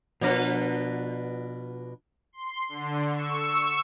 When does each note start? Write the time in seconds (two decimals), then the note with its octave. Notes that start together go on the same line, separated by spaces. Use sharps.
0.21 B2 F3 D4 A#4 B4
2.33 C6
2.69 D3
3.13 C#6 E6